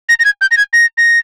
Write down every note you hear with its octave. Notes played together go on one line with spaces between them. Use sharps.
A#6
A#6
G#6
G6
A#6
G#6
A#6
A#6